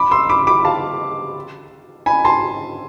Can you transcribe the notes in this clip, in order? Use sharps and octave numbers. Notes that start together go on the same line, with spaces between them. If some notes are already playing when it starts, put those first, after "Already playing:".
Already playing: B5 D6
C6 E6
B5 D6
B5 D6
F5 A5
G#5 B5
A5 C6